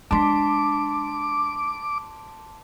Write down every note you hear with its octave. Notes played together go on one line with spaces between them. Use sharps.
G#3 D4 A5 C6 D6 B6